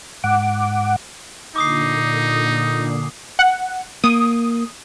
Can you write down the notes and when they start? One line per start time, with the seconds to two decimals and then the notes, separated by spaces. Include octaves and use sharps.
0.24 G#2 F#5 D6
1.56 A#2 D3 D#4 D6 D#6 C7
3.39 F#5
4.04 A#3 D#6